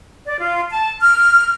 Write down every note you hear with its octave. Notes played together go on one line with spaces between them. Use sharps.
D5
F4
A5
F6